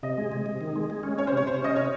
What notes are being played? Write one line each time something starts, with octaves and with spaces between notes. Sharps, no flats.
C3 D#5
G#3
C3
C3
D#3
G#3
G#3
C#4
C#4 C#5
C5
C3 C#5
C3 C5
C#4 D#5
C3 C#5